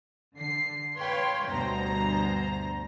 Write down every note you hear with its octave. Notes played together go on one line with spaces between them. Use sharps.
D3 C7
B4 C#5 F5 G5 C6
D2 G2 B2 C5 A#5